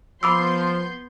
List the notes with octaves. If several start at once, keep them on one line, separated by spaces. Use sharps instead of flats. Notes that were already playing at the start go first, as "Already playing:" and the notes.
F3 B3 B5 C6 D6 E6 G6